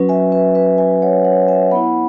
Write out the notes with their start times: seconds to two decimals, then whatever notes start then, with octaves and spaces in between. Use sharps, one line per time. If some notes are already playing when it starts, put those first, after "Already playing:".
Already playing: F#3 C#4 F#4 B4
0.09 E5 G#5
0.32 B4 E5
0.55 B4 E5
0.78 E5 G#5
1.02 C#5 F#5
1.24 C#5 F#5
1.48 E5 G#5
1.71 B3 E4 F#5 B5